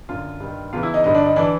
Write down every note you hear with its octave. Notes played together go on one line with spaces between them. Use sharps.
F#2 D3 F4
G2 D#3
E2 C#3 E3 F4
E4
D#4
G2 D3 D#4
D4
D#4
E3 D4